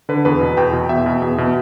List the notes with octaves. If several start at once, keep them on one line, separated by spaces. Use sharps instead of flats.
D3 B4
E2 B4
B2
E2 G5
B2
E2 E5
B2
E2
B2